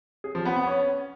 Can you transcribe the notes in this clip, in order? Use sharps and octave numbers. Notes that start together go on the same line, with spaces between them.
G#4
F3
B3
B3
C#4